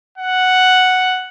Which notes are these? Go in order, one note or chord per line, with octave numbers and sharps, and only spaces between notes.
F#5